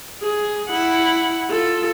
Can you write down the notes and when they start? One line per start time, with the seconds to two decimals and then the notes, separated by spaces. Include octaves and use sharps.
0.22 G#4
0.70 E4 F#5
1.49 F4 A4